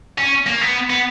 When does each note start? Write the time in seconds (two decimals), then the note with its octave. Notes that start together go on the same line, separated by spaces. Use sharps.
0.18 C#4
0.46 A#3
0.61 B3
0.90 B3